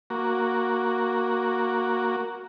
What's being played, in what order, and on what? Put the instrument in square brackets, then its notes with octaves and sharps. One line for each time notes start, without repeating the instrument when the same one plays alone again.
[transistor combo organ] A#3 F#4